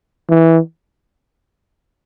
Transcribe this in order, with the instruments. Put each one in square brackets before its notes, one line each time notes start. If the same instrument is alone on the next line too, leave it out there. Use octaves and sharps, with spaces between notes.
[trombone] E3